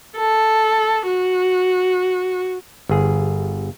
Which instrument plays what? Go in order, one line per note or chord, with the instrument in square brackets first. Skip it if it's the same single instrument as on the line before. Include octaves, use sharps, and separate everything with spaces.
[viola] A4
F#4
[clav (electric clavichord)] G1 G#4